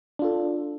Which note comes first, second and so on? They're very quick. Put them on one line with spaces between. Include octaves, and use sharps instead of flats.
D4 F4 A4